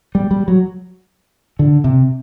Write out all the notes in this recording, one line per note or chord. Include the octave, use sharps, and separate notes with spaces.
G3
G3
F#3
D3
C3